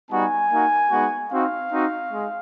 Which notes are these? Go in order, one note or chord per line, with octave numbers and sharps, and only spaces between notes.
G3 B3 D#4 F#4 G#5
A#3 D#4 F#4
G#3 B3 D#4 F#4
C4 D#4 F#4 F5
C4 D#4 F#4
G#3